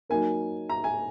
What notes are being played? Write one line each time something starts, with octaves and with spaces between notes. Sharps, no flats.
F#3 A#3 D#4 A#4 G#5
A#5
G#5